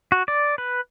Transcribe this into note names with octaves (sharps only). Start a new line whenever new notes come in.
F#4
D5
B4